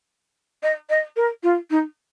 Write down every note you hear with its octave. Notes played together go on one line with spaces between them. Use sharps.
D#5
D#5
A#4
F4
D#4